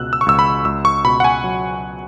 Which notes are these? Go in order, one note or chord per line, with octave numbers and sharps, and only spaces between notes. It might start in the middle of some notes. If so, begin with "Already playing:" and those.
Already playing: C#2 B2 E6 F#6
E6
C#6
C#2 E6
B5
C#2 E6
C#6
B2 B5
F#5
G#5
F#3